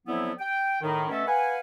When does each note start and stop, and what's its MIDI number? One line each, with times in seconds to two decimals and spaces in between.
0.07 0.32 50
0.07 0.32 53
0.07 0.32 54
0.07 0.32 59
0.07 0.32 60
0.07 0.32 64
0.39 0.81 79
0.82 1.07 45
0.82 1.07 51
0.82 1.07 63
1.09 1.23 47
1.09 1.23 57
1.09 1.23 61
1.09 1.23 69
1.09 1.23 76
1.09 1.23 78
1.27 1.59 71
1.27 1.59 77
1.27 1.59 78
1.27 1.59 80